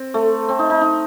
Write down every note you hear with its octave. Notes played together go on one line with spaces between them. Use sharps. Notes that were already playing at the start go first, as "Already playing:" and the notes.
Already playing: C4
A3
C4
D#4
D#4
D#4